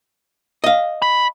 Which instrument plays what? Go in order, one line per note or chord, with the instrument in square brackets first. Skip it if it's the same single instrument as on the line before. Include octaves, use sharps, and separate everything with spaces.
[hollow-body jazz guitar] D#5 F5
[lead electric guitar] B5